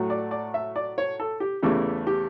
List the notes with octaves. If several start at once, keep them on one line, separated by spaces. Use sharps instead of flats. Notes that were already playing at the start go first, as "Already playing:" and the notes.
Already playing: A2 F#3 A3
D5
D5
E5
D5
C#5
A4
G4
E2 C#3 E3 A3 G4
G4